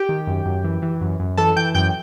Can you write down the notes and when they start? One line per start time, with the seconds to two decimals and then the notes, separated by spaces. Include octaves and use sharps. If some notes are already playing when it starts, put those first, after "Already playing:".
Already playing: G4 G5
0.09 D#3
0.27 F#2
0.45 F#2
0.64 E3
0.82 E3
1.01 F#2
1.20 F#2
1.37 E3 A4 A5
1.56 E3 G5 G6
1.74 F#2 G5 G6